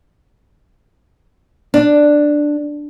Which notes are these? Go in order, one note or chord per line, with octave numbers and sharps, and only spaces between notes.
D4